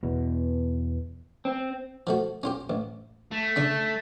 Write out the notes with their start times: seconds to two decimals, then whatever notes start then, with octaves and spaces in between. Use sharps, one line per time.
0.03 E2 B2
1.45 C4
2.07 F3 A3 F#4
2.43 C#4 F4 G4
2.70 A1
3.31 A3
3.56 C#3 D4